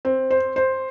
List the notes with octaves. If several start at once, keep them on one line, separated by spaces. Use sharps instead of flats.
C4
C5
C5